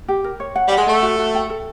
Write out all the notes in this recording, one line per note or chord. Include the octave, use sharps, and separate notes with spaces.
G4
A#4
C#5
F#5
G3 F#5
G#3
A3 A4
F#4
F#4
G5
A4